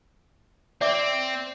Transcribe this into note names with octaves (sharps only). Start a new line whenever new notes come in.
C4 D5 E5 D6